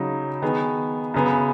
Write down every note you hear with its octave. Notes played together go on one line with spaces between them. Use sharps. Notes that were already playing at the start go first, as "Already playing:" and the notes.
Already playing: C#3 F#3 D#4
D#3 B3 G#4
F#2 C#3 B3 G#4